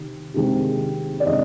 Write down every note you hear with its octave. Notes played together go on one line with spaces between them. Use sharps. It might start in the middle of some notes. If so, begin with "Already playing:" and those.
Already playing: C3 D#3 C4
C3 D#3 G#3 C4
D5
C3 D#3 G#3 C4 D#5